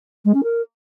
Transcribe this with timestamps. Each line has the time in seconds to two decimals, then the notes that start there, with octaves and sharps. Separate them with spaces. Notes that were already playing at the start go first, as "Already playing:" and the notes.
0.25 G#3
0.34 C#4
0.43 A#4